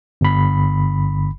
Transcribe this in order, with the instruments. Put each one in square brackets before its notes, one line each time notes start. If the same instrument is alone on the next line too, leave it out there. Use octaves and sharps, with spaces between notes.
[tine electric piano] G1 B5